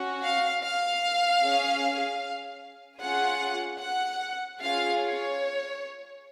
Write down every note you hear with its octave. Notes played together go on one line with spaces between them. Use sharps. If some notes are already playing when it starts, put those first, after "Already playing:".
Already playing: C#4 F#4
F5
F5
C#4 G#4
C#4 F4 G#4 F#5
F#5
C#4 F4 G#4 F5
C#5